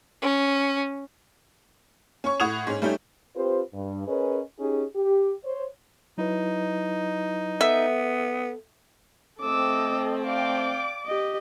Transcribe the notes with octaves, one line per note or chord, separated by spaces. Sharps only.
C#4
C#4 C#5 C#6
A2 F#5 C#6 D#6 G#6 F7
G#2 C#4
G3 A3 C#4 D#4 G4
C4 F4 G4 B4 C5
G2
C#4 G#4 A#4 B4 C#5 D#5
C#4 D#4 G4 G#4
G4
C5 C#5
F#3 D#4 E4 B4
B3 A4 E5
A3 C4 A4 D#5 D6 E6
D5 F5 G5 D6
G4 D#5